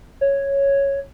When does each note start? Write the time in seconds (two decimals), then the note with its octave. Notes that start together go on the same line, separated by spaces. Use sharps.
0.21 C#5